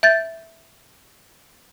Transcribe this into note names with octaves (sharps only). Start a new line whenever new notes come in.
E5 G6 A6